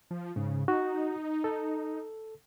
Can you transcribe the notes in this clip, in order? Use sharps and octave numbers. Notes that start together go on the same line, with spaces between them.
F3
G#2 C#3
D#4 F#4
A4